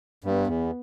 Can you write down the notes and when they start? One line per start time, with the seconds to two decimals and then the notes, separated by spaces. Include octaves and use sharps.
0.24 G2 B3
0.47 E2